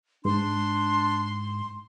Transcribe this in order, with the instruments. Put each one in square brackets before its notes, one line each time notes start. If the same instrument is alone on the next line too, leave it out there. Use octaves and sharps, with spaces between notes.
[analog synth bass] G#2 [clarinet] D4 [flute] C6